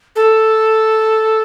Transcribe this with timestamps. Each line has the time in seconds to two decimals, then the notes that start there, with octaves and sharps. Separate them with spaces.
0.16 A4